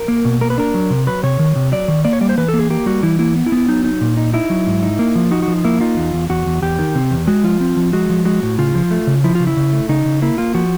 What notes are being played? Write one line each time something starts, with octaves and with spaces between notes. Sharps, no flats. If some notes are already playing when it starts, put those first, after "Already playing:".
Already playing: A#4
A#3
B2
A#3 A#4
B4
D4 A#4
F#3
C3
F#3 B4
C3 C#5
D#3
C3
F#3 D5
D#3
A#3 D5
C#5
G3 D5
C5
E3 B4
A4
A#3
G#4
A#3 G4
G3 F#4
E3 E4
A#3 E4
B3
E4
B3
E4
F#3 D#4
D#4
A#2
D#4
D#4 E4
F#3
G#2
D#4
A#3
F3
D#4 F#4
F#4
F3
A#3 E4
D#4 F4
E2
E2
E2 F#4
E2
E2 G4
D#3
C3
E2
G#3 F#4
F3 F4
C4
F3
G#3 F#4
F3
G#3 F#4
A2
C#3 F4
F3
A3
C#3
F3 E4
C#3 F4
E4
C#3
A3
C#3 D#4
C#3
A#3 E4
A#3 F4
F3 F#4